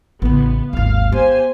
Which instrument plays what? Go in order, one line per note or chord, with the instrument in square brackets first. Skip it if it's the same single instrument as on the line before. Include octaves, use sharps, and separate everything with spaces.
[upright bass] A1 C#3 [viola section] B3
[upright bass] G#1 D#2 [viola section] F5
[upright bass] B3 [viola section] G4 C5 G#5